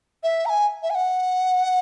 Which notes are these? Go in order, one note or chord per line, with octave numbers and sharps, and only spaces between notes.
E5
A#5
G#5
E5
G#5
F#5